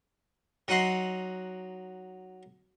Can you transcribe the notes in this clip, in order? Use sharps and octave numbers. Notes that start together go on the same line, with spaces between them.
F#3 D#4 F#5 C6